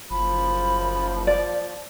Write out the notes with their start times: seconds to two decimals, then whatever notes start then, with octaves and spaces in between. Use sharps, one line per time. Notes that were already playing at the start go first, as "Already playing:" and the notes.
0.11 F#1 F3 B5
1.27 D5